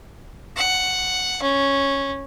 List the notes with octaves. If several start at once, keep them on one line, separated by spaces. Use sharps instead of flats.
F#5
C#4